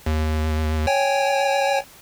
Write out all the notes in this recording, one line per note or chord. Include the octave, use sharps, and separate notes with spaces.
D#2
C#5 G5 G#5